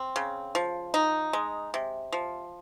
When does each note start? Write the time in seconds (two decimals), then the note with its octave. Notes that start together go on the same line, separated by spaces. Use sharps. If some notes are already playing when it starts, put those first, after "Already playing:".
Already playing: C4
0.16 C#3
0.55 F3
0.94 D#4
1.33 G#3
1.74 C3
2.12 F3